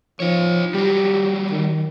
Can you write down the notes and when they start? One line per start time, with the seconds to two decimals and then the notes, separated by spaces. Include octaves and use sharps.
0.20 F3 D#4 C#5
0.74 F#3 G3 G4
1.51 D#3